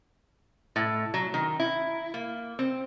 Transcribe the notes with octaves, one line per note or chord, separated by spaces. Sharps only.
A2
F#3
D#3
E4
A#3
C4